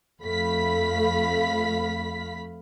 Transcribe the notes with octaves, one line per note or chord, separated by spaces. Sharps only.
F2 A3 F5 B5 B6